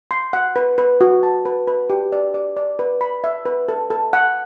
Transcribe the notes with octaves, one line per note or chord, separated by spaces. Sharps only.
C6
F#5
B4
B4
F#4
A5
B4
B4
G4
D5
D5
D5
B4
B5
E5
B4
A4
A4
F#5